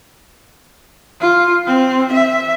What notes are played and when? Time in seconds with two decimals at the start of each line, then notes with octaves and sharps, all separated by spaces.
1.21 F4
1.67 C4
2.12 E5